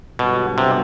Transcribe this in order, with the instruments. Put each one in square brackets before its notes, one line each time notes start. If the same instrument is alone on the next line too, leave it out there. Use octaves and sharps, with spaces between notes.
[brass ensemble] G1 G2 F#3 B3 F#4 [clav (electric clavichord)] B2
[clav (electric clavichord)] C3